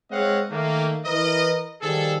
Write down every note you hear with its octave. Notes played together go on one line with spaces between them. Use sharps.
G#3 C4 C#5 D#5 F5 F#5
D#3 A3 A#3
E3 A#4 B4 D#5
D#3 F3 G3 G#4 A4